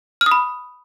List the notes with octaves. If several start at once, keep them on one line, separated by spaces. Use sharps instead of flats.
F6
D#6
B5